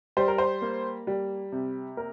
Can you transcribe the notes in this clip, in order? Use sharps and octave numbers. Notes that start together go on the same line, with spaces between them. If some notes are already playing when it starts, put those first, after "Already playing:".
G3 C5
A#4
C5
A#3
G3
C3
A#3 A#4